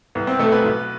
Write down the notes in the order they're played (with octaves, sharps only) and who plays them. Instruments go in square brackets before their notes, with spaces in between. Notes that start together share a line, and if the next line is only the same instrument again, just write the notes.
[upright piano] C2 B3
C4
B2 A3 A4
B3 B4
B1